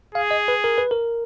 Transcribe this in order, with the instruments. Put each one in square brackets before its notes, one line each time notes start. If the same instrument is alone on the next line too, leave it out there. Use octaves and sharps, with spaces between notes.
[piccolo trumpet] G#4 [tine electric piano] F5
[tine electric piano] D#5
B4
A#4
B4
A#4